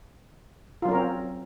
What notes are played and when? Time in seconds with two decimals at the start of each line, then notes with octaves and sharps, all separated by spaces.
0.82 F4
0.85 F#3
0.88 C#4
0.91 A#4
0.94 C4